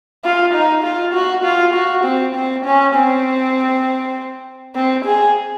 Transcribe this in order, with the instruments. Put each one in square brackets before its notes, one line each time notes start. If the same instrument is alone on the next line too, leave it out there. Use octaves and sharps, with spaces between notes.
[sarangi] F4
D#4
F4
F#4
F4
F#4
C4
C4
C#4
C4
C4
G#4